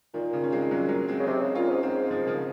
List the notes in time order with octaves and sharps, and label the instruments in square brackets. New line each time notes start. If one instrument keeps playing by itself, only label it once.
[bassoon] A#2 [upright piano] D#3
[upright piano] C#3
C#4
G#3 C4
F#3 A#3
F#3 A#3
G#3 C4
[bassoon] C#3
[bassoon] C3 [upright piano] C4 D#4
[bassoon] C#3
[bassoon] A#2 [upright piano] C#4 F4
[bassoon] G#2
[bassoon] G#2 [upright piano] G#3 C4
[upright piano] F3
D#3
C#3 F3